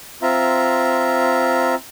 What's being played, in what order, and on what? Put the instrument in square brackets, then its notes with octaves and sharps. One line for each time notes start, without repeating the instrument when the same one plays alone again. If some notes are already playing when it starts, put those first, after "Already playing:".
[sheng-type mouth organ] C4 F4 E5 A#5